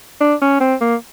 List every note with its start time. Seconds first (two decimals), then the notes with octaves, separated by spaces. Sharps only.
0.21 D4
0.42 C#4
0.61 C4
0.81 A#3